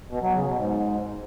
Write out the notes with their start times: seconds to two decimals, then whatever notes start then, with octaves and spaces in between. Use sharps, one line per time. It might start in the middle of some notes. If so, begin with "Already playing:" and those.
0.11 B2
0.23 F#3
0.34 C#3
0.46 B2
0.58 G#2